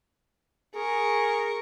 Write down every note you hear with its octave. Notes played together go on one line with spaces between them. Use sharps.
G#4 A#4 C#6